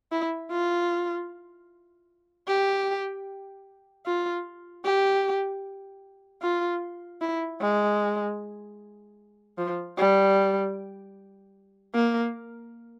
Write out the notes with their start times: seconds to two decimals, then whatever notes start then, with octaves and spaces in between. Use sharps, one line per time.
0.12 E4
0.51 F4
2.48 G4
4.06 F4
4.85 G4
6.42 F4
7.21 E4
7.61 G#3
9.58 F3
9.98 G3
11.95 A#3